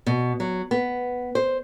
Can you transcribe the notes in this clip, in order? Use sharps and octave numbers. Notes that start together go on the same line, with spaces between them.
B2
F#3
B3
C5